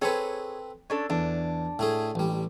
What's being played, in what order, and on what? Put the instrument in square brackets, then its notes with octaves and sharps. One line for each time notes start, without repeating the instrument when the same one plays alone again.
[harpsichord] C4 A4 B4 [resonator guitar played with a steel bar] G#4 C#5
[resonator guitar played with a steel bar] C#4 D4 A4
[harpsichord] E2 [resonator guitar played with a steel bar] D4
[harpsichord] A2 A3 G#4
A1 G3